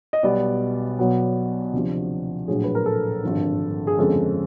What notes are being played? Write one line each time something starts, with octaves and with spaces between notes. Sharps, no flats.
D#5
B1 B2 G3 B3 D5
B1 B2 F#3 B3
D2 C3 F3
A#1 A2 F#3 G#4
B4
A#4
A4
G#1 G2 D3 F3
G#4
G1 F2 C#3 F3 G#3 A4